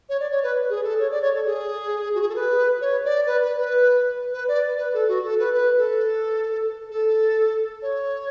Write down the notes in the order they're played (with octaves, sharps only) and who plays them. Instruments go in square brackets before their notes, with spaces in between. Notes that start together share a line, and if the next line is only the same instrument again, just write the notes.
[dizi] C#5
D5
C#5
B4
G#4
A4
C#5
D5
C#5
A4
G#4
F#4
G#4
A4
B4
C#5
D5
B4
B4
B4
B4
D5
B4
A4
F#4
A4
B4
B4
A4
A4
C#5